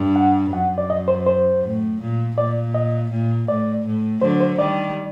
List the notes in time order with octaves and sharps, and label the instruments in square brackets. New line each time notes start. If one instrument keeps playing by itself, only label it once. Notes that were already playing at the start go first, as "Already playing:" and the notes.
Already playing: [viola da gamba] G2
[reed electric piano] F#5
[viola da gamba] F#2 [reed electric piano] F#5
[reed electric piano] D5
D#5
C5
C5
[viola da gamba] A2
A#2
[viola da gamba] A#2 [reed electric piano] D5
[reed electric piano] D#5
[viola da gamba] A#2
[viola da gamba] A2 [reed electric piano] D5
[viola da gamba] A2
[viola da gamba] D3 F#3 [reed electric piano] C5
[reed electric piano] C5
[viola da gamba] D#3 G3 [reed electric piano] D5